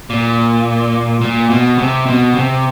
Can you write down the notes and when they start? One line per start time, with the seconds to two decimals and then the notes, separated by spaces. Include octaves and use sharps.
0.10 A#2
1.21 A#2
1.50 B2
1.78 C3
2.06 B2
2.35 C3